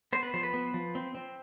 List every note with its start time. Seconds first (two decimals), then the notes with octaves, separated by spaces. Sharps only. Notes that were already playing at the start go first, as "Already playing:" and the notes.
0.13 B3 C5
0.23 B4
0.34 F3 C5
0.43 B4
0.54 B3
0.74 F3
0.95 C4
1.15 C4